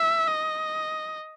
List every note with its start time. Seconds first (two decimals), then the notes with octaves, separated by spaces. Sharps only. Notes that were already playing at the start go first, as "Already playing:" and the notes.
Already playing: E5
0.28 D#5